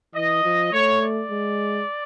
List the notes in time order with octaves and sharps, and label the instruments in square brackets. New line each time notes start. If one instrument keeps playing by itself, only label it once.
[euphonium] E3 [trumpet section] D#5
[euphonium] F3
[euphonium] A3 [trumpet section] C#5
[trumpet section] D5
[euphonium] G#3